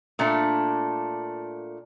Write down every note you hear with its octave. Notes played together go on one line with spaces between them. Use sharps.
A#2 A3 D4